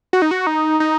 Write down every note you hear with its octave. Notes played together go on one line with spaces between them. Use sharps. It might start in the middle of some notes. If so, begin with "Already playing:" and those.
F#4
D#4
F#4
D#4
D#4